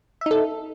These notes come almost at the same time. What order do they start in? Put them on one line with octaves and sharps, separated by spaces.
E5 D#4 A4